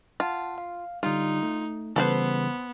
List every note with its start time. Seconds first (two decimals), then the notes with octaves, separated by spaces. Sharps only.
0.20 F4 F#5 A5
0.58 F5
1.03 D3 G3 D#4 F4
1.43 A3
1.96 C#3 E3 G3 B3 A4 B4 C5